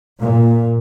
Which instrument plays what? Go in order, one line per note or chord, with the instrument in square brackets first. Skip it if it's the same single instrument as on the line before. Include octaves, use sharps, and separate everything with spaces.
[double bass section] A#2